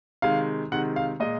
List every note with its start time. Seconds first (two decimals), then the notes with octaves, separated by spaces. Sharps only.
0.22 C3 D#3 G#3 F5
0.72 C3 D#3 G#3 F#5
0.96 F5
1.20 A#2 G#3 D#5